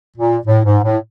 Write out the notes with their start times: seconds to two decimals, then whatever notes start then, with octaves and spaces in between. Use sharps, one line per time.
0.17 A#2
0.46 A2
0.65 G#2
0.84 A2